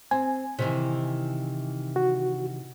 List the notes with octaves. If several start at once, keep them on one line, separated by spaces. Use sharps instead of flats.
C4 G#5
C3 D#3 E3
F#4